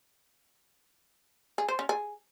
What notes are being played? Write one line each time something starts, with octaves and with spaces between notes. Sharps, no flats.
G#4
C5
C#4
G#4